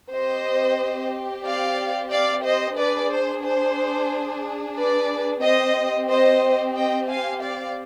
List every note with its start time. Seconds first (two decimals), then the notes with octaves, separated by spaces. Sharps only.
0.13 C4 G4 C5 D#5
1.46 D5 F5
2.12 D5 F5
2.45 C5 D#5
2.78 D4 G#4 B4 D5
3.11 C5
3.44 C5
4.77 B4 D5
5.43 C4 G4 C5 D#5
6.10 C5 D#5
6.76 D#5 G5
7.09 F5 G#5
7.42 D5 F5